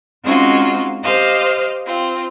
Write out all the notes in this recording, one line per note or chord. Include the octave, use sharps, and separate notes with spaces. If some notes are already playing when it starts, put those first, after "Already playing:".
G#3 C4 C#4 D#4 F4 F#4
G4 C5 D#5 F5 F6
C4 F4